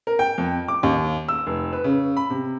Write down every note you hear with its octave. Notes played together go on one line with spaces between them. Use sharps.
A#4
G5
F2
D6
D#2
E6
F1
B4
C#3
B5
C3